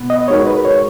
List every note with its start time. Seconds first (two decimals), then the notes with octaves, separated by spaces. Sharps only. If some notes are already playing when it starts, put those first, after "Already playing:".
Already playing: B2 B3
0.10 D#5
0.28 G#3 D#4 F#4 A#4 C#5
0.47 B4
0.65 C#5